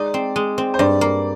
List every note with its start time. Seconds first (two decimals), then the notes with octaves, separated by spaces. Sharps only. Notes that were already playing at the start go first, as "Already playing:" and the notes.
Already playing: G#3 D#4 D5
0.14 C4
0.36 G#3
0.58 C4
0.74 C5
0.79 G2 D5
1.01 A#3